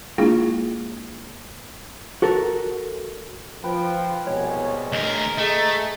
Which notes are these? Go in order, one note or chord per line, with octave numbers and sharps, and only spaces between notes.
G#3 A#3 D4 E4 F4 G#4
F#4 A4 A#4
F3 B4 G5
C2 B2 G#3 C#5
D2 A#4 D#5
A3 G#4 A4 D#5 A#5